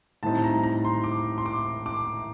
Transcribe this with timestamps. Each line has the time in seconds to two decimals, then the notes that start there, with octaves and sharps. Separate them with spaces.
0.23 A2 G3 C4 D#4 A5
0.44 A#5
0.63 A#5
0.85 C6
1.04 D6
1.38 C6
1.46 D6
1.86 D6